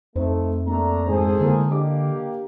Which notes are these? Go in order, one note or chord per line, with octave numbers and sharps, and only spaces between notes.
F2 A3 D#4 C5
A3 A#3 D4 A#5
E1 G#2 G#4 A4 C5
D3 E3 G#3 A#3
A#3 D4 G4 D#5 D6